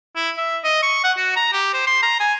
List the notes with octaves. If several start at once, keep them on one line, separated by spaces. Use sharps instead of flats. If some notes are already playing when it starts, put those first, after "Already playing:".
E4
E5
D#5
C#6
F#5
F#4
A#5
G4
C5
C6
A#5
G#5